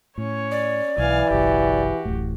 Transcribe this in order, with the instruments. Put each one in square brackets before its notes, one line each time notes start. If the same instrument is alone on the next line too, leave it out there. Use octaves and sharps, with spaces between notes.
[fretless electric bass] A2 [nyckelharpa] C#4 C#5
[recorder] D5
[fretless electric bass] B1 [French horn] E3 [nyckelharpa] F5 G#5
[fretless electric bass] F#1 B1 [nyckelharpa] F#4 G4
[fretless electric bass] D1 A1 A2